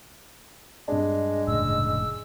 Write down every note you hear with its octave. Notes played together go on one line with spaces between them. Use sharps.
G2 G#3 D4
F1 A2 C#3 E6